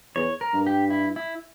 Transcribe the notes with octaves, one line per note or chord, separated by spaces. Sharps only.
E2 C#5
A#4
G2
G4
E4
E4